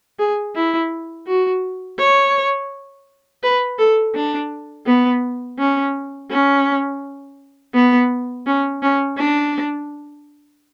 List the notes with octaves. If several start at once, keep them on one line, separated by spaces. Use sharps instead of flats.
G#4
E4
F#4
C#5
B4
A4
D4
B3
C#4
C#4
B3
C#4
C#4
D4